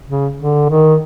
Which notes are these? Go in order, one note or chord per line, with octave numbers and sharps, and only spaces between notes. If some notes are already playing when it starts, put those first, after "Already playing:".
C#3
D3
D#3